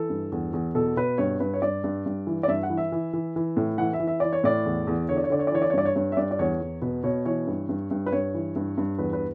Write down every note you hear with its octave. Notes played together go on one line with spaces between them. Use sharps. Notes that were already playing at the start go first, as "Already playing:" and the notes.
Already playing: E3 A4
G2
E2
E2
B2 A4
B2 B4
G2 C#5
G2 B4
C#5
G2 D5
G2
G2
E3
D5
G2 E5
F#5
E3
E5
E3
E3
E3
A2
E3 F#5
E5
E3
E5
E3 D5
C#5
A2 D5
E2
E2
D3 C#5
D5
C#5
D3 D5
C#5
D5
E3 C#5
D5
C#5
G2 D5
C#5
G2 C#5
E5
G2 D5
D5
E2 C#5
E2
B2 B4
B2 C#5
E3 C#5
G2
G2
G2
B4
G2 C#5
E3
G2
G2
E2 B4
B4